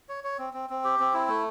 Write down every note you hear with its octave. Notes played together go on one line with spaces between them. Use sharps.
C#5
C#5
C4
C4
C4
G4
C4
E4
A3